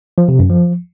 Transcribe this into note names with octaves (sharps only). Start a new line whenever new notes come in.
F3
C3
F#2
F3